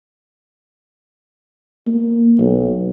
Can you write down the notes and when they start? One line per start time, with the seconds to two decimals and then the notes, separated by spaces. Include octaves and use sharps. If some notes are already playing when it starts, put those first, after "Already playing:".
1.87 A#3
2.39 B1